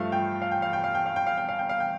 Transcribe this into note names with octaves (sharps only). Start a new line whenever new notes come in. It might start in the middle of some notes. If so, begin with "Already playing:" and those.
Already playing: G2 F3 A3 F5
G5
F5
G5
F5
G5
F5
G5
F5
G5
F5
G5
F5
G5
F5
G5